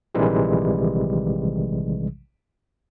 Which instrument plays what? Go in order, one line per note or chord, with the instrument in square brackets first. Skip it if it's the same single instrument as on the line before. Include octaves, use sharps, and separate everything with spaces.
[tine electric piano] A#1 C3 D#3 E3 G3 G#3